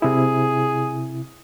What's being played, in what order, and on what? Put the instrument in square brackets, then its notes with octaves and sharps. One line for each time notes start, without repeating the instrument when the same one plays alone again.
[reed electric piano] C3 E4 [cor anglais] G#4